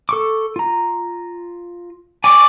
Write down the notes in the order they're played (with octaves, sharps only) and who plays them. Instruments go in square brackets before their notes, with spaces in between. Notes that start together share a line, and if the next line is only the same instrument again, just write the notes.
[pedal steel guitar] A4 C#6 D6
F4 A#5
[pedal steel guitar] G#5 C#6 [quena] D6